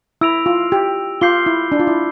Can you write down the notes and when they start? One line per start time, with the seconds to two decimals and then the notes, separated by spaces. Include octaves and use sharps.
0.21 E4 E6 A#6 D7 F7
0.46 F4
0.72 G4
1.21 F4 D6 G6 C7 G7
1.46 E4
1.72 D4
1.80 F4
1.87 E4